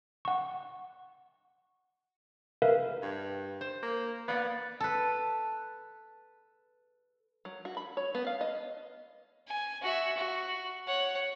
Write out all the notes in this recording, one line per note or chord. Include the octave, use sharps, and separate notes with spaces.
F#5 C#6
A#4 B4 E5 F5
G2
C5
A#3
A#3 B3 D5 F5
A4 B4
F#3
F#4
B5
C#5
B3
F5
D#5
G#5
F#4 E5
F#4
C#5 F#5